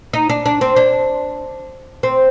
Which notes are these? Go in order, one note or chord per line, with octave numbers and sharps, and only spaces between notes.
D#4
D4
D4
C4
D4
C4